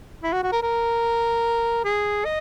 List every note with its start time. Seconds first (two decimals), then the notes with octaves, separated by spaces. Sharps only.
0.23 E4
0.32 F#4
0.43 F#4
0.52 A#4
0.62 A#4
1.84 G#4
2.25 D#5